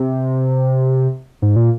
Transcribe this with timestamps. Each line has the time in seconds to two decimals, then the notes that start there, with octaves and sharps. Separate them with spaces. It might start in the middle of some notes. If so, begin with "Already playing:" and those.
Already playing: C3
1.42 G#2
1.56 A#2